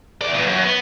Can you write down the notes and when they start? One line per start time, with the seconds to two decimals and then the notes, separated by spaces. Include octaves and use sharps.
0.22 E2 D5
0.34 E2 A#2
0.47 F#2
0.63 B3